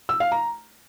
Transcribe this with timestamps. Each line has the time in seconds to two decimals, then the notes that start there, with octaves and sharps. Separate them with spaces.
0.09 E6
0.20 F5
0.32 A#5